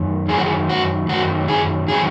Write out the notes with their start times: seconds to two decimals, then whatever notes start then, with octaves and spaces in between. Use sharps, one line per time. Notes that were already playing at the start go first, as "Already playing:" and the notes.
Already playing: F#2 D#3
0.29 F#2 D#3 F#3 G#4
0.38 F#4
0.46 G#4
0.69 F#4
1.09 F#2 D#3 F#3 F#4
1.48 G#4
1.88 D#3 F#3 G#4